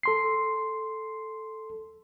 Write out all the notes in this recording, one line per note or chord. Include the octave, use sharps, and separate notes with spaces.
A4 C6 C7